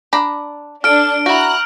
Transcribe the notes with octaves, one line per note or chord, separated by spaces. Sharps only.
D4 A#5 B5
D4 A4 F6 D7
E4 F#4 A#5 F#6